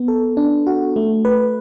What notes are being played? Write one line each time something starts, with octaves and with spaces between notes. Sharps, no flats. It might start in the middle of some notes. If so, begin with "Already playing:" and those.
Already playing: B3
A4
D4
F#4
A3
B4